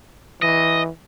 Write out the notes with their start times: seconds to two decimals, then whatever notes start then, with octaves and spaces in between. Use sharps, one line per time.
0.42 E3 D#5